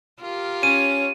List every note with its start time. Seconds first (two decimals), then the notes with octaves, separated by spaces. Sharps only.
0.21 F4 G4 A#4
0.63 C#4 D#7